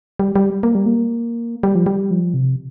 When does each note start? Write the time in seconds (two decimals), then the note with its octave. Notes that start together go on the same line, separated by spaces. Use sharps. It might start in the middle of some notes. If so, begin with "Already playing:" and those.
0.19 G3
0.36 G3
0.63 A#3
0.75 G3
0.86 A#3
1.63 G3
1.75 F3
1.86 G3
2.11 F3
2.34 C3